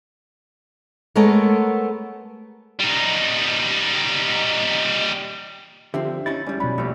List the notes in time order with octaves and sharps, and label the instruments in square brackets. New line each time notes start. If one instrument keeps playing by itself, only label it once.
[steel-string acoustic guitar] G#3 A3 B3 A4 A#4 C#5
[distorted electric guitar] G3 D#4
[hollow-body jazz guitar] D3 F3 C4 [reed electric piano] G4 [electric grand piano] E5
[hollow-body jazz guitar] C#4 D#4 E4 [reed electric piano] A6
[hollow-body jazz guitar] G#2 G3 [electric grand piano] C#4 E4 D5
[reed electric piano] B2 B5 [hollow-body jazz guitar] F#3
[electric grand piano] A#1 [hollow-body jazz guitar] G3 A3